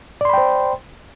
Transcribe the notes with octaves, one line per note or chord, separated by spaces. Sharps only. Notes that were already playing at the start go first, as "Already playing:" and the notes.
C5 D5 G5 B5 C6